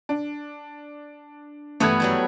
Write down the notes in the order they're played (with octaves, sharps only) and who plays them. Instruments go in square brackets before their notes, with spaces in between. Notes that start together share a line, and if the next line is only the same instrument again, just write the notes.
[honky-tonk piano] D4
[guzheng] G2 E3 B3 [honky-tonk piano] A3 F#6 G#6
[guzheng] F#3 G3 E4